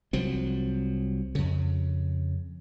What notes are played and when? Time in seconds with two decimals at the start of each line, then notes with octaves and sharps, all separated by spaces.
0.13 C2 F3 F#3 C4
1.35 F2 C#3